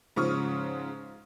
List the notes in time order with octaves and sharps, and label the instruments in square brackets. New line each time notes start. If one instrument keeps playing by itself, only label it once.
[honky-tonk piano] G#2 C#3 F3 C#6 D#6 F6